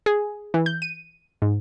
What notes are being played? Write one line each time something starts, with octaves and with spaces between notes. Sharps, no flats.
G#4
E3
G6
D#7
G#2